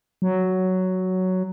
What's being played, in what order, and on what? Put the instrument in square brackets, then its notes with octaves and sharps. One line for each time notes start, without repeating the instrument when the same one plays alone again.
[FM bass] F#3